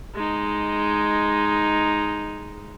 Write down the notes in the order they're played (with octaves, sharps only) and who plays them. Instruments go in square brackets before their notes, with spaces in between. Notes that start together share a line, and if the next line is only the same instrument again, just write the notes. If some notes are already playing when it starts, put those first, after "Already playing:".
[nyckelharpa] G#3 D#4